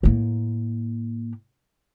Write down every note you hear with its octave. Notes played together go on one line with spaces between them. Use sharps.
A2 A#3